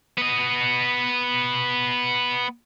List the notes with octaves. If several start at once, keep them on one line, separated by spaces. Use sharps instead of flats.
B3 D#5